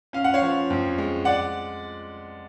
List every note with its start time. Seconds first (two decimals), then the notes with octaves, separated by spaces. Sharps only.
0.13 C#4 F5
0.24 F#5
0.34 C#5 F5
0.42 F3
0.70 F2
0.98 G#3
1.25 D5 F#5